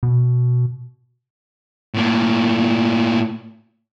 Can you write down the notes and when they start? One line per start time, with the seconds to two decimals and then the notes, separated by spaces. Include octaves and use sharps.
0.03 B2
1.94 A2 A#3